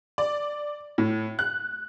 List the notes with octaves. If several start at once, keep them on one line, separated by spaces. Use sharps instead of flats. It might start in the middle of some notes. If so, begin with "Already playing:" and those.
D5
A2
F#6